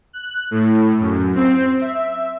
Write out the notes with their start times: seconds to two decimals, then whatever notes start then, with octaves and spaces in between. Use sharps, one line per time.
0.13 F#6
0.51 A2
1.00 F#2
1.35 C4
1.81 E5